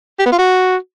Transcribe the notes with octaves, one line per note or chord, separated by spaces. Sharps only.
G4
B3
F4
F#4